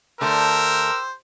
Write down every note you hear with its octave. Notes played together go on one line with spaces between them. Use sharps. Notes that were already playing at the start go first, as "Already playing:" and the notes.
D3 A3 G4 A#4 C5 A5 E6